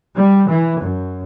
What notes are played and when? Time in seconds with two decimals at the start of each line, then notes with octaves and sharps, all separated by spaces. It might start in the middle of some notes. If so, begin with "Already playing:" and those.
0.19 G3
0.50 E3
0.82 F#2